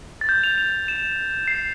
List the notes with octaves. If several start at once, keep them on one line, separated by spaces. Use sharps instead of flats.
A6
G6
F7
F7
E7
C7